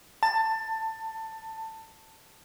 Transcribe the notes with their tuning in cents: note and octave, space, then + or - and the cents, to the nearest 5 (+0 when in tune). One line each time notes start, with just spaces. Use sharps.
A5 +20